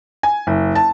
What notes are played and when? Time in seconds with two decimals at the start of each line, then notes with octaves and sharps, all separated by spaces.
0.23 G#5
0.47 F#1
0.75 A5